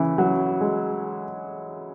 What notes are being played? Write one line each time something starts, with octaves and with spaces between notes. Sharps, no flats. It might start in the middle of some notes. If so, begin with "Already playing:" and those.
Already playing: C#3 E3
F#3
G#3